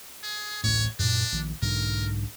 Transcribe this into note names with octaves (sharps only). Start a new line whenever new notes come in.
G#4
D1 A1 A2 C#5
F#2 A#2 D4
A#1 D#3
B1 G#2 D3 A#4